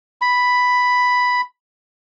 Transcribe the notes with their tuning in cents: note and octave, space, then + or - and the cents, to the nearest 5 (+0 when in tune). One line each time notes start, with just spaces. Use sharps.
B5 +0